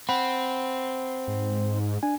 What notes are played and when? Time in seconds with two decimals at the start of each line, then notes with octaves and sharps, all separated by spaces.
0.09 C4 F#5 B5
1.28 G#2
2.03 D4 G#5